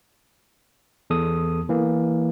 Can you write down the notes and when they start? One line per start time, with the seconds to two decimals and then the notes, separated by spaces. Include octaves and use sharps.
1.10 E2 A4 D#6
1.69 E3 A#3